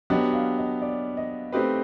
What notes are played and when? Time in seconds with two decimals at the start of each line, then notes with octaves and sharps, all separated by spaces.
0.10 F#3 B3 D4 G4 D#5
0.33 F5
0.58 D#5
0.82 D5
1.17 D#5
1.52 A3 C4 D#4 G4 B4